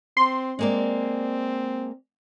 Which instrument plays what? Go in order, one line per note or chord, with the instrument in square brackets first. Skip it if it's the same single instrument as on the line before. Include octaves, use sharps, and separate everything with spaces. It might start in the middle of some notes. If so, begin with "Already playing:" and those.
[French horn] C4 [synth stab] C6
[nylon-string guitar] G#3 A#3 D5 [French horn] C4